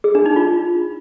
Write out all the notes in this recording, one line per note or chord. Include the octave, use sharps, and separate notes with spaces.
G#4
D4
D#4
F4